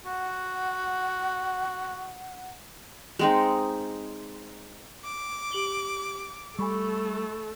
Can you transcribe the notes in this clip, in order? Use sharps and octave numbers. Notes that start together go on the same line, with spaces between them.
F#4 F#5
G#3 C4 D#4
D6
G4 F#7 G7
G3 A3 A4 G#5 B5 C#6